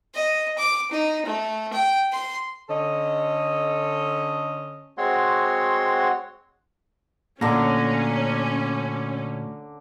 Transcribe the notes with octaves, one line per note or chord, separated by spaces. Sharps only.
D#5
D6
D#4
A3
G5
C6
D3 C#4 A4 D#5
G#3 C4 F#4 C#5 F#5 C6
D2 A#2 D3 C#4 A#5